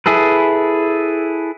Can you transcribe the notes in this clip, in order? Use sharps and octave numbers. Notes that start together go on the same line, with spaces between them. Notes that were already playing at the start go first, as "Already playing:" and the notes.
E4 G#4 A4 B4